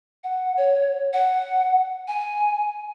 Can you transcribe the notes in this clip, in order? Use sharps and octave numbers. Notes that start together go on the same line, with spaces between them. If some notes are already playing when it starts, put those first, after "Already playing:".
F#5
C#5
F#5
G#5